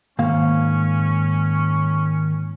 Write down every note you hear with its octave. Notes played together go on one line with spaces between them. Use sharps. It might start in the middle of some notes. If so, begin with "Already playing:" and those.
G#2 D#3 A#3 C#4 F5